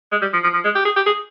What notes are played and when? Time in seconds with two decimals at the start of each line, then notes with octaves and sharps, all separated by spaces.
0.12 G#3
0.22 G3
0.33 F3
0.44 F3
0.54 F3
0.65 G#3
0.76 G4
0.85 G#4
0.96 G4
1.06 G#4